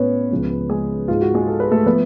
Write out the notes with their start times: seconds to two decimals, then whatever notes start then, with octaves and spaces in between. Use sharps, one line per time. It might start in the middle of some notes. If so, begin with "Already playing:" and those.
Already playing: A2 G#3 B3 C#4 B4 C#5
0.31 C#2 C#3 F3 G#3
0.70 G#3 G#4
1.08 G#2 G#3 F4
1.21 F#4
1.34 G#3 G#4
1.48 A4
1.60 B4
1.71 A3 A4
1.86 F3 A3 B3 B4